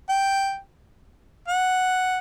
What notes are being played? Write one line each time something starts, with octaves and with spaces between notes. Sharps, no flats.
G5
F#5